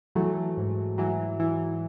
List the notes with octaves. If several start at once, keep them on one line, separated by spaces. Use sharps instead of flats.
E3 F#3 A3
G#2
E3 F#3
E3